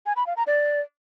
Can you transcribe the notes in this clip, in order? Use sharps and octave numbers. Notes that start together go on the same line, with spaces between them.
G#5
B5
F5
A#5
D5